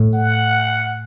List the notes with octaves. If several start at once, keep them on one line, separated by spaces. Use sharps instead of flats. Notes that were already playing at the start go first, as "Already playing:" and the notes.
Already playing: A2
F#5